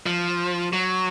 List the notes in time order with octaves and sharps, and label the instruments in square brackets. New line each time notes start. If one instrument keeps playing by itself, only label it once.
[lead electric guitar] F3
F#3